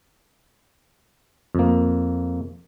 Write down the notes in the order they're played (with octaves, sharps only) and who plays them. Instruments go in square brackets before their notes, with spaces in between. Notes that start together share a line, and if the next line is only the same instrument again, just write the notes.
[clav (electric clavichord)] F2 A#3